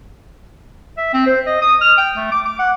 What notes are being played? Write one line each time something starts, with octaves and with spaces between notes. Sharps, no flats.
E5
C4
C5
D#5
D#6
F6
G5
A3
D6
D6
F#5